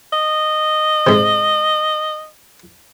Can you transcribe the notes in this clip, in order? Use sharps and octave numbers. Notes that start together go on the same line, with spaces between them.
D#5
G#2 C3